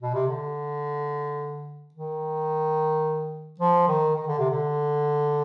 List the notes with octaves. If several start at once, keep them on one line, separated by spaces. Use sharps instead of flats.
B2
C3
D3
D#3
F3
D#3
D#3
D3
C3
D3